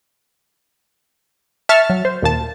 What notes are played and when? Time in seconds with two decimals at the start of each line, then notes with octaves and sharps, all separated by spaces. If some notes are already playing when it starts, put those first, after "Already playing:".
1.69 E5 A5 C#6 F6
1.90 F#3
2.05 C5
2.22 D#2 A#2 A5